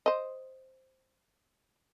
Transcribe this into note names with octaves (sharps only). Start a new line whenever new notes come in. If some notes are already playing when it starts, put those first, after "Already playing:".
C5 D#5